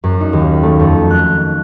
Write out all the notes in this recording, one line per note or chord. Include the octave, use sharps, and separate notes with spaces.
F#2
D#4
D#2
A3
F2
F#6